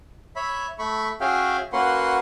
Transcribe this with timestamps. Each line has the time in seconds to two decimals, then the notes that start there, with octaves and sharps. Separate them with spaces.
0.36 C#5 E5 B5
0.79 A3 B5 C#6
1.21 C#4 F#4 G#4 E5 F5 G5
1.73 A#3 C#4 F#4 B4 F#5 C6